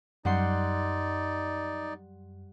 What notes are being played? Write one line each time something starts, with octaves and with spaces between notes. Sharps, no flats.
F#2 G3 D#4 D5 F#5 C6